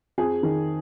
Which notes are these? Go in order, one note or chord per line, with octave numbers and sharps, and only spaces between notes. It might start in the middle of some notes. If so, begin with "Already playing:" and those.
F2 G#4
D#3